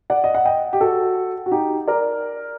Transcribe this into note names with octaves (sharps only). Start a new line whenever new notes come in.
D5 F#5
D#5
F#5
D#5 G5
G4
F#4 A4
F#4
D#4 G4
A#4 D5